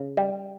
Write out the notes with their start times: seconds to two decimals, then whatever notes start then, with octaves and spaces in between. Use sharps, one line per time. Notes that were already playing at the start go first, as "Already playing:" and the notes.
Already playing: C#3
0.17 G3